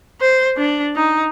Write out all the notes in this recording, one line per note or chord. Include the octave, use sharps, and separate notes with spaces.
C5
D4
D#4